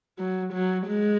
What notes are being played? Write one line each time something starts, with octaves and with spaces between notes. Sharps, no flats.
F#3
F#3
G#3